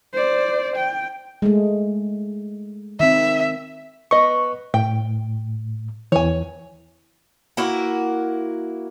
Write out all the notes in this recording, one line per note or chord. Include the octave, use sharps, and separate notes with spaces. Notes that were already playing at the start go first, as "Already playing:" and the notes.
C5 D5
G5
G#3 A3
D#3 C4 E5
B3 D#5 C#6
A2 G5
E2 E3 C#5 G#5
A#3 E4 F#4